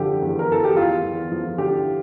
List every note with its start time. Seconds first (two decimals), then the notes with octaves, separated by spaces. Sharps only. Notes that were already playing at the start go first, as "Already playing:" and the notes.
Already playing: D3 F3 G4
0.22 E2
0.39 A#4
0.49 E2 A4
0.64 G4
0.76 E2 F4
1.03 E2
1.32 F3
1.58 D3 G4